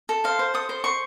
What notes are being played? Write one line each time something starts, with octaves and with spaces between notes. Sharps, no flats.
A4
C5 F5
C5
A4 D#6
C5
C5 C#6